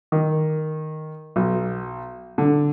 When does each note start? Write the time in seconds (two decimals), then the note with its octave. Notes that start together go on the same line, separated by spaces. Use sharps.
0.12 D#3
1.36 B1
2.38 D3